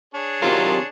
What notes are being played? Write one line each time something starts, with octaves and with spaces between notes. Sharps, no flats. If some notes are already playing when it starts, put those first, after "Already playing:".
D4 G#4 C#5
C3 D#3 F#3 C4 F4 G4 A#4